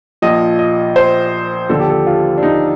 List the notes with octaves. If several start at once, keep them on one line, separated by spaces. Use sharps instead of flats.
A#1 A#2 F3 D#5
D#5
C5
D#2 D3 F3 A4
G4
A4
F4
D4
D#4